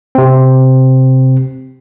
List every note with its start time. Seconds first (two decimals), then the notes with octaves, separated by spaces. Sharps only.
0.15 C3 C4